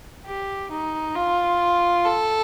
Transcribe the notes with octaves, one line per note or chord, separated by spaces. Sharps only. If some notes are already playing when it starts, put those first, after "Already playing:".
G4
D#4
F4
A4